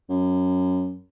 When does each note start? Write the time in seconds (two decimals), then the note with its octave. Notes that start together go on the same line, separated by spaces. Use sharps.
0.09 F#2